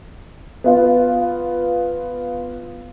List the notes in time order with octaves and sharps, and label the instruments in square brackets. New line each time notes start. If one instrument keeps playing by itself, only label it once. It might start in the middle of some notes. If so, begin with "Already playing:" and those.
[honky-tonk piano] B3 F4